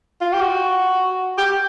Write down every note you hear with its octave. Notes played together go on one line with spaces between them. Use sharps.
F4
G4
F#4
G4